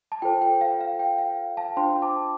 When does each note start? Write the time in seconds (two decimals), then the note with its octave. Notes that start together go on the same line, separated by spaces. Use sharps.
0.12 A5
0.22 F4 A4 C5 G5
0.42 G5
0.61 F5
0.81 F5
0.99 G5
1.18 F5
1.57 F5 A5
1.77 D4 F4 C5 G5 C6
2.02 A5 D6